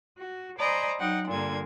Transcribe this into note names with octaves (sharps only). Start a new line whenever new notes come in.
F#4
C5 D5 D#5 G#5 A#5 B5
F#3 D#4 F#5 G5
G2 A#2 D3 A#3 G#6